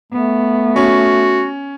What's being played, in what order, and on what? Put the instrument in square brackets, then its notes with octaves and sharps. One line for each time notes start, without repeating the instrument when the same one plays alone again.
[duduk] A3 [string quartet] B3
[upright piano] C#4 [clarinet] F#4